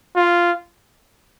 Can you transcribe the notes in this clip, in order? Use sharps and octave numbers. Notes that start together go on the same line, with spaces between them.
F4